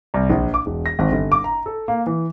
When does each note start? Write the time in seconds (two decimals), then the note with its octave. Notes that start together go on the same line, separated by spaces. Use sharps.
0.14 C2
0.30 A#1
0.54 D6
0.66 E1
0.86 A#6
0.99 G#1
1.12 G1
1.32 D6
1.44 A#5
1.66 A4
1.88 A#3
2.06 E3